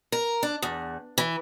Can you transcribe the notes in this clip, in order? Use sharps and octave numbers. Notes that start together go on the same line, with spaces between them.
A#4
D4
E2
E3